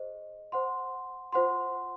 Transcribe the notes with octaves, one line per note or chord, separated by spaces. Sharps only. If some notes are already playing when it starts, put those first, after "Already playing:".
Already playing: G#4 C5 D#5
C5 F#5 C6
F4 C5 F#5 C6